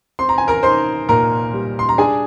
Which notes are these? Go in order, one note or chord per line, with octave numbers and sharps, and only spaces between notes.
C4 C6
A#5
G#5
A#4 A#5
D#4 C5 C6
A#2 A#4 A#5
G3
C6
A#5
D4 G#4 G#5